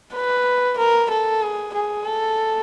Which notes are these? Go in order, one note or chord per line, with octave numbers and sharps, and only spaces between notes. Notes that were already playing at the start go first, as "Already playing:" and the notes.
B4
A#4
A4
G#4
G#4
A4